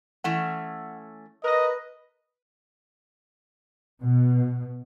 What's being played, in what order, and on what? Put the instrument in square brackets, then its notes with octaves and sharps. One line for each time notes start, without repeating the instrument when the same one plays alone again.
[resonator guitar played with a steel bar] E3 A3 C#4 [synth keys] F#5
[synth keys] A#4 A#6 [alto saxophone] B4 [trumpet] D#5
[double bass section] B2